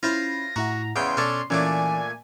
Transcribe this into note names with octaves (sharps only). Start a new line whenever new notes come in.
C#4 E4 F4 C5 F5 B5 A#6
A2 E4 F#4 F#5 A#5
E2 C#3 F#5 G5 C6
B2 C#4 D4 A4
A#2 E3 A3 C#4 D4 G#5